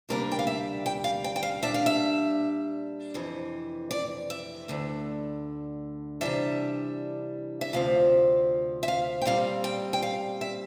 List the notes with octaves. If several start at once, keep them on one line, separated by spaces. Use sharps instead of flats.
D2 C3 G3 A#3 D4 A#4
G5
F5
E5
G5
F5
G5
G5
F5
A#2 G3 D4 E5
F5
E5
F2 C3 E3
D5
E5
D2 D3 A3
C3 E3 G3 D4 E5
E5
D2 C3 F3 C4 F5
E5
F5
G5
A#2 G3 C4 F5
G5
G5
F5
E5